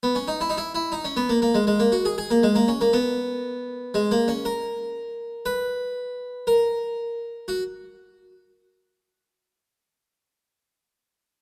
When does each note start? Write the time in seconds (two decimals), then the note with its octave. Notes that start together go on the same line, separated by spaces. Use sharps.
0.03 B3
0.15 C#4
0.28 D#4
0.41 E4
0.50 D#4
0.57 E4
0.75 E4
0.92 D#4
1.05 C#4
1.17 B3
1.29 A#3
1.42 A#3
1.54 G#3
1.67 G#3
1.80 A#3
1.92 F#4
2.05 G#4
2.18 G#4
2.30 A#3
2.43 G#3
2.55 A#3
2.68 C#4
2.81 A#3
2.93 B3
3.94 G#3
4.11 A#3
4.28 C#4
4.45 A#4
5.46 B4
6.47 A#4
7.48 F#4